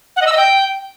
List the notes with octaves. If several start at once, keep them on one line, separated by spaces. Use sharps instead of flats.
F#5
D#5
E6
D#5
G5